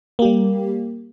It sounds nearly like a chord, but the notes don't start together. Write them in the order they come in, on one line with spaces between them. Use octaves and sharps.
A#3 G4 G3